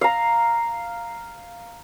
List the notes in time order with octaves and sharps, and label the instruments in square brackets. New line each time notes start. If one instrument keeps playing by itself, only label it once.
[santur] F5 A#5